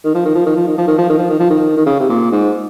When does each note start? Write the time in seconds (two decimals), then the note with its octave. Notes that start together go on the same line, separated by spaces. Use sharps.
0.04 D#3
0.14 F3
0.25 D#3
0.35 F3
0.46 D#3
0.56 F3
0.67 D#3
0.78 F3
0.87 D#3
0.98 F3
1.09 D#3
1.19 F3
1.30 D#3
1.39 F3
1.50 D#3
1.77 D#3
1.86 C#3
2.00 C3
2.09 A#2
2.31 G#2